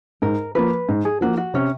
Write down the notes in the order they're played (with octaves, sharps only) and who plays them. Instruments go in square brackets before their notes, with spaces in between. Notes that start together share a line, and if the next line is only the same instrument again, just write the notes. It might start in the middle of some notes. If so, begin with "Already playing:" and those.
[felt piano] G#2 [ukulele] A#4
[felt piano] F3 A#3 [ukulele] B4
[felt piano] G#2
[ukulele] G#4
[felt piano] F3 A#3 [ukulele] F#4
[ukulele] F#4
[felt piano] C3 [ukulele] C#4